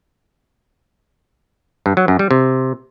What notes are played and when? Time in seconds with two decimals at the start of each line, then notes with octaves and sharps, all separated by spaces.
1.86 G2
1.97 F#3
2.08 F#2
2.19 G3
2.31 C3